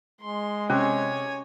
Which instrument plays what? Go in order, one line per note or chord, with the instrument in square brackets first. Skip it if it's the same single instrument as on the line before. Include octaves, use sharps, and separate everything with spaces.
[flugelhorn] G#3 [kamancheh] C6
[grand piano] C3 [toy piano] C#4 [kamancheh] C#5 G#5